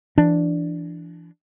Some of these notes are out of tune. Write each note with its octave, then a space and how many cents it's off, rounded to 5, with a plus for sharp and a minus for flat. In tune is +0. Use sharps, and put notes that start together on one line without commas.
E3 +35 D4 +0